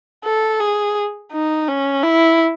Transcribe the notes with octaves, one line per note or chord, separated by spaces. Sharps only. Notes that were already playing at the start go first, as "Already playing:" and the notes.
A4
G#4
D#4
C#4
E4